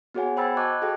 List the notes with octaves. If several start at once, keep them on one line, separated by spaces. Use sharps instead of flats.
B3 F#4 G#4 C#5 F#5 G#5
C5 G5 B5 E6 G#6 A6
D#5 A5 C#6 D6 F#6 G#6
F#4 G#4 A4 D#5 F5 G5